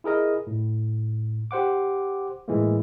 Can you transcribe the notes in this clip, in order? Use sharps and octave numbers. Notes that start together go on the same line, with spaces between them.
E4 G#4 A#4 D#5
A2
G4 C5 F#5 D6
A2 E3 G#3 A#3